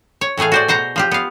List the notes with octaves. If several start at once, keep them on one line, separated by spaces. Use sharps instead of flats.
C#5
A2 E3 A3 G#4 F5
F#4 C5 D5
B2 C5 F#5 A#5
F3 F4 G4
B3 F5